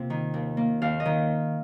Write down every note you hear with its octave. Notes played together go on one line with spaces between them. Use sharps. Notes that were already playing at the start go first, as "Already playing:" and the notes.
Already playing: C3 A#3 F4
D#3
D#2
A#3
D#2 F5
D#5
D#3